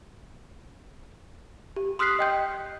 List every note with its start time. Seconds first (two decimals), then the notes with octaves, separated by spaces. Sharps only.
1.76 G4
1.99 C6 D#6 F6 F#6 B6 C7
2.19 D#5 G5 G6